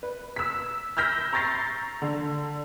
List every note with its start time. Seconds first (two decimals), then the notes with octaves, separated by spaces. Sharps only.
0.03 B4
0.36 E6 B6
0.97 E6 F6 G6 A#6 B6
1.33 A#5 C#6 G6 A6 A#6 C7
2.02 D3